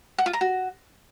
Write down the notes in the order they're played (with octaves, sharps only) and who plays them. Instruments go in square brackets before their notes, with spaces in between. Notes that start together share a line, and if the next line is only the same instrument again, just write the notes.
[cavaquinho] F#5
F4
A#5
F#4